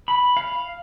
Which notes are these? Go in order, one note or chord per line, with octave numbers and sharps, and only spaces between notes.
B5
F5